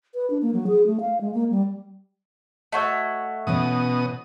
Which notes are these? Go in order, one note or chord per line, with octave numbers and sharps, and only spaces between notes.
B4
D4
A#3
F#3
G#4
A3
F5
G#3
A#3
G3
A3 F#4 C#5 D#5 C#6 E6
B2 E3 B3 C#4 D#6